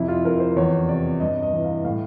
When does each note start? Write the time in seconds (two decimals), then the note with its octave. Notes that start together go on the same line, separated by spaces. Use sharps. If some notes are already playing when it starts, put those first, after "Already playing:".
Already playing: F2 C3 E4
0.08 F4
0.24 F2 A#4
0.40 C5
0.56 E2 C#5
0.88 C3 D5
1.20 G2 D#5
1.43 D#5
1.53 E3
1.64 F5
1.84 A2 F5